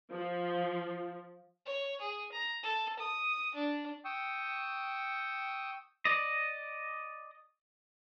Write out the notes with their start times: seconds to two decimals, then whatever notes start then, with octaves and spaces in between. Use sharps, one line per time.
0.11 F3
1.66 C#5
2.00 G#4
2.32 A#5
2.63 A4
2.99 D#6
3.55 D4
4.05 G5 C#6 D#6 E6
6.05 D5 D#5